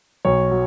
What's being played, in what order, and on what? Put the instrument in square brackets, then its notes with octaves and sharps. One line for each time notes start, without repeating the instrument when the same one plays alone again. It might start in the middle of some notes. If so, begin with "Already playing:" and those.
[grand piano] B1 C#5
F#3